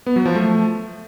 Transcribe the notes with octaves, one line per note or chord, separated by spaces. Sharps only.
B3
F#3
F3
A3